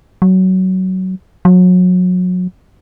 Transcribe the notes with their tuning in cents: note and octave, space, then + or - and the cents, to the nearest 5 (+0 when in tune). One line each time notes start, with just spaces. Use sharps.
F#3 +15
F#3 -30